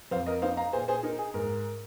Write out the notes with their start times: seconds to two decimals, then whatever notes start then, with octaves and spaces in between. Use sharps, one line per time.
0.11 F2 C5 F5
0.26 A#4 D#5
0.42 D#4 C5 F5
0.57 F5 A#5
0.73 A#2 G#4 C5
0.88 G#4 C5
1.03 D#4 A#4
1.18 G#4
1.34 G#2 A#4